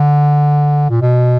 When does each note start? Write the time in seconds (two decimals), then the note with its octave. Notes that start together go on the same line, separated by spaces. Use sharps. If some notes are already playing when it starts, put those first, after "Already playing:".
Already playing: D3
0.90 A#2
1.01 B2